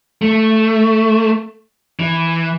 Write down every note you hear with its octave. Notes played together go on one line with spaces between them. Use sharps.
A3
E3